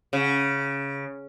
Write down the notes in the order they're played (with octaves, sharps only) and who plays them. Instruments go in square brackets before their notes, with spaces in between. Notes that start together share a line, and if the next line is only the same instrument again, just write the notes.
[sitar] C#3